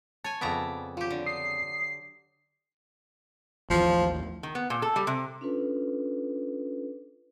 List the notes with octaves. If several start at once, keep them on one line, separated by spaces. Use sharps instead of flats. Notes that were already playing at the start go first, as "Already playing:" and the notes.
C#5 G#5 A5
F2 C#3 B3 D5 E5 A#5
F#3 F4 G4
D3
D#6 C7
A1 D#2 E3 F3
D#3
B3
A#2
A4
G3
C3
C#4 D4 F4 A4 B4